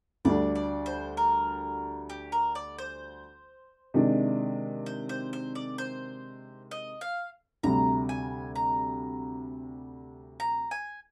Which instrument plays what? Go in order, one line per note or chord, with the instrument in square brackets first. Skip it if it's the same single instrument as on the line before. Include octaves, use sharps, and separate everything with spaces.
[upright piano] D2 D3 G3 D4 [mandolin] D5
[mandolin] D5
C5
A#4
G4
A#4
D5
C5
[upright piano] C3 D#3 G#3 D4
[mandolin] C5
C5
C5
D5
C5
D#5
F5
[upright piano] D2 C3 G3 [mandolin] A#5
[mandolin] G#5
A#5
A#5
G#5